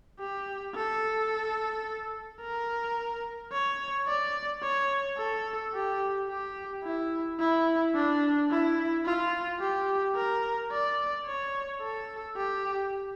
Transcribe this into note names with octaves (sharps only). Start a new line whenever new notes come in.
G4
A4
A#4
C#5
D5
C#5
A4
G4
G4
E4
E4
D4
E4
F4
G4
A#4
D5
C#5
A4
G4